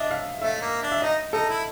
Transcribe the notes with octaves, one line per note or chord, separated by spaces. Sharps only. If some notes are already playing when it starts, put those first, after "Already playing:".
Already playing: D4 D#5 E5
F5
A3 E5
A#3
D4
E5
D#4 D#5
D#4 A4
E4